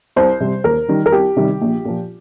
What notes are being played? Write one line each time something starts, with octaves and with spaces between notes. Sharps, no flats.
C2 C5
C3 G3
D#2 A#4
D#3 G3
A#4
C2 G4
C3 D#3 G3
A#1
A#2 F3